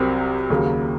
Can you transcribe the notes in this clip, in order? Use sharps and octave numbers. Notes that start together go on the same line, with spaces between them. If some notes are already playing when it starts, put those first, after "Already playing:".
Already playing: C2 C3 F#3 C4 A#4
D#2 C#3 F#3 A#3